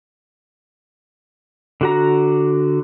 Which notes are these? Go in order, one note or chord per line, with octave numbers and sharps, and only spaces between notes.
D3 F#4 A#5